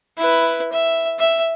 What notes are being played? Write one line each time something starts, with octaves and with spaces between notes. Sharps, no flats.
E4 B4
E5
E5